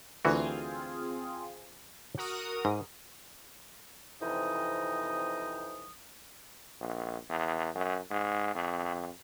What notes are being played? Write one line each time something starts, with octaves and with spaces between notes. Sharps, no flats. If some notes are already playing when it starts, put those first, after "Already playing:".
D2 E3 C4 F4 F#4 G#4
F#4 A#4 D#6
G#2
F2 C3 E3 D#4 D#5 D#6
A#1
E2
F#2
G#2
F2